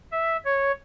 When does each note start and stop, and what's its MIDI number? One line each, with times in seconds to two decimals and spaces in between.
0.12 0.37 76
0.45 0.72 73